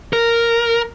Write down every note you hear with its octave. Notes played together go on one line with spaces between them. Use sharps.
A#4